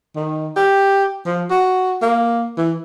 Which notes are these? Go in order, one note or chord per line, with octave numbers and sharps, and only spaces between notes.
D#3
G4
F3
F#4
A#3
E3